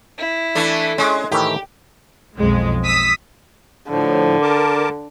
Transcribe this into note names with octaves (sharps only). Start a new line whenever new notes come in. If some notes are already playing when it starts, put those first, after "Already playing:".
E4
E3 A3 D4
G#3 C#4 G#4
A2 D#3 E3 G4
B1 F2 G#3
D#6 E6 B6
A2 D3 F3
A#4 A5 D6